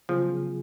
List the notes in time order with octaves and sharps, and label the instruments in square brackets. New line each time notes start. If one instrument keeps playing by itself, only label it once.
[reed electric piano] C#3 F#3 B3 F4 G#4 [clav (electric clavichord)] F3